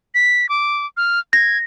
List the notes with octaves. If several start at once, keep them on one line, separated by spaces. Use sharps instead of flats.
B6
D6
F6
G#6 A#6